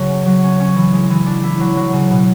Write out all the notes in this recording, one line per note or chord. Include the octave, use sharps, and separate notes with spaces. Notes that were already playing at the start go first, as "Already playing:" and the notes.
Already playing: C#3 F#3 F#4
C#4
F#3
C#4
C#4
E3
G#3
E3
D4
E4
F#3
F#3
C#3
B2